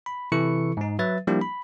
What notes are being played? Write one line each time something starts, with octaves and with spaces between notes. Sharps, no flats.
B5
C3 E3 E4 A4 C#6 C#7
G#2 D#4
F#3 B4 E5 A6
F3 G3 A#3 D4 E4 G4
B5